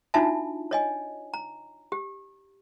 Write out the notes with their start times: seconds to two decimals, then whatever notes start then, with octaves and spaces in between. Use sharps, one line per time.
0.14 D4 D#4 F4 F#4 E5 A5
0.71 C#5 D#5 G#5
1.34 A#5
1.92 G4